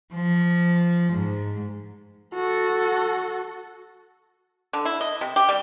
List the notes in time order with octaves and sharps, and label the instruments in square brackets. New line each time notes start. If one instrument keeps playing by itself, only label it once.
[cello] F3
G#2
[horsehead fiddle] F#4 A4
[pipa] D3
E4
D#5
C3
G4
G3